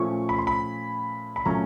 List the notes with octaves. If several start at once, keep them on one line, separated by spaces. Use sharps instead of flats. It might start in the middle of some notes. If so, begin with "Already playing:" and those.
Already playing: A#2 F3 A3 C#4 C#6
B5
C6
B5
B5
A#2 F#3 A3 C#4 A#5